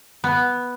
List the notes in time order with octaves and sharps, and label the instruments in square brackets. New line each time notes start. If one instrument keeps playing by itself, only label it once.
[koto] B3